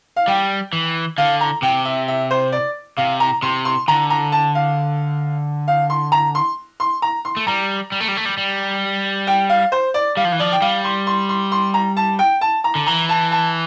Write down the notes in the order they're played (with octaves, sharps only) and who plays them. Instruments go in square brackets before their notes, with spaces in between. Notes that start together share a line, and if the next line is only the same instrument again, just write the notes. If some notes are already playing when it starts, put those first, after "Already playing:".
[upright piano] F5
[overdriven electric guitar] G3 [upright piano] G5
[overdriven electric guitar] E3
[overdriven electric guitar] D3 [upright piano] F5
[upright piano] A#5
[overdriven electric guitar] C3 [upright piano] G5
[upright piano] E5
E5
C5
D5
[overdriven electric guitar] C3 [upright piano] F5
[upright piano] A#5
[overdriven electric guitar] C3 [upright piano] C6
[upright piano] C6
[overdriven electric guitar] D3 [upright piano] A#5
[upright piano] A#5
A5
F5
F5
C6
A#5
C6
C6
A#5
C6
[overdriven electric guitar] A3
[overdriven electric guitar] G3 [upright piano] A#5
[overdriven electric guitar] G3
A3
G3
A3
G3
G3
[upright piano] G5
F5
C5
D5
[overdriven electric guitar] G3 [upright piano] F5
[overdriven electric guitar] F3
E3
[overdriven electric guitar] F3 [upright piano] D5
[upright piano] G5
[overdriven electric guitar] G3 [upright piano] F5
[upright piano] C6
C6
C6
C6
A#5
A5
G5
A5
A#5
[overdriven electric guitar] D3
[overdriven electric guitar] E3 [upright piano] A#5
[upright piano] A5
A5